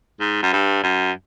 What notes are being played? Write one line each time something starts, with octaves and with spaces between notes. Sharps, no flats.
G#2
F#2
G2
F#2